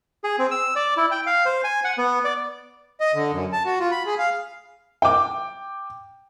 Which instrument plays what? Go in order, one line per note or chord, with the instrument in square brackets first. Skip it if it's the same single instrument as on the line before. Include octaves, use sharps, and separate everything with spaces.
[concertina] G#4
C4
E6
D5
E4
G5
F5
C5
G#5
F#5
B3
D5
[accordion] D#5
D3
F#2
A5
F#4
F4
B5
G#4
F5
[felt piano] G5 D6